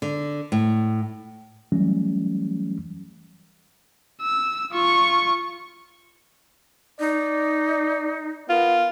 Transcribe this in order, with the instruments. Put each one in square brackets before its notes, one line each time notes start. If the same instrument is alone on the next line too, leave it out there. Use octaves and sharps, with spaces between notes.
[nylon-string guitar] D3
A2
[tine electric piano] E3 F#3 G3 A3 C#4
[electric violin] E6
F4 C#6
[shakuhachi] D#4 [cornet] D5
[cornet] B3 [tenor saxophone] F4 [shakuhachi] A#4